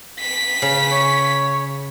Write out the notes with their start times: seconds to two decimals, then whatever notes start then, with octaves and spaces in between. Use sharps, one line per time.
0.21 B6
0.62 C#3
0.91 C#5